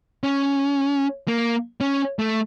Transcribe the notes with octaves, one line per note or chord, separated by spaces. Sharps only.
C#4
A#3
C#4
A3